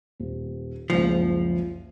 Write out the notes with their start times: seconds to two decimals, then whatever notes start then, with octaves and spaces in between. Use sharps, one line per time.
0.20 D#1
0.90 F#1 C#2 F3 C7